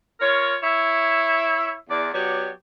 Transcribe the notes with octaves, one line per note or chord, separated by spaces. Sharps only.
F4 A#4 C#5
E4 C#5 E5
E2 D5
F#3 B3 G4 C#5 D5